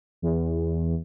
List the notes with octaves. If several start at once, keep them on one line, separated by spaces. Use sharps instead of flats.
E2